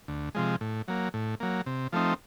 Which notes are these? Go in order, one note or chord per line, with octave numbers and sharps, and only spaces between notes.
D2
C3 F3 G#3
A2
F#3 A#3
A2
F#3 A#3
C3
F3 A3 C4 D#4